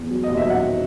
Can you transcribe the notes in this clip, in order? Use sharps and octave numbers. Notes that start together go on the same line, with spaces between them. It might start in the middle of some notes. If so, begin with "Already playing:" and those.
Already playing: E2
F#3
D#2 D#5
E5
F#3 F#5